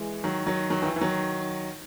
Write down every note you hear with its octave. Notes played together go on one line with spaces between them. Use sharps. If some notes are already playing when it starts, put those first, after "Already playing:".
Already playing: E3 G#3
D#3 F#3
D#3 F#3
D#3 F#3
D#3
E3
E3
D#3 F#3